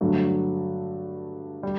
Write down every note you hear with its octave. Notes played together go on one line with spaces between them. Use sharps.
G2 D3 F#3 A3
G3